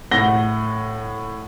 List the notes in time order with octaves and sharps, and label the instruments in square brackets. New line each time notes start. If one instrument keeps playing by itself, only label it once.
[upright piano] A2 F#5 A#6 G7